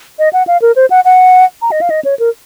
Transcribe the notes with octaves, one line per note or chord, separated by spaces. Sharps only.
D#5
F#5
F5
A#4
C5
F#5
F#5
A#5
D#5
F5
D#5
C#5
A#4